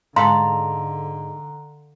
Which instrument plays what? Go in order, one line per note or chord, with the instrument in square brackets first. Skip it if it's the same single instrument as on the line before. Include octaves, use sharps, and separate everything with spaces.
[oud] G#2 A4 [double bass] D3 [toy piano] F5 C6 [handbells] A#5